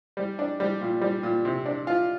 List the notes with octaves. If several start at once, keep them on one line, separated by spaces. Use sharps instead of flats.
G3
D4
G3
A#2
G3
A#2
C3
D4
F4